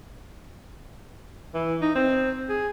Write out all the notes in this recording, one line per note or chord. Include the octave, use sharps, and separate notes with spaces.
E3
D#4
C4
G#4